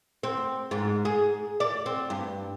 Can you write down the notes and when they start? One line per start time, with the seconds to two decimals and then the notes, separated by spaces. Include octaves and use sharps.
0.23 C4
0.71 G#2
1.05 G#4
1.60 D5
1.86 C4
2.10 G2